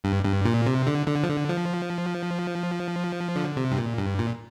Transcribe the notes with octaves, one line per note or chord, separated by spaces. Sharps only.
G2
G2
A#2
C3
D3
D3
F3
D3
F3
D3
C3
G2
A#2
G2
A#2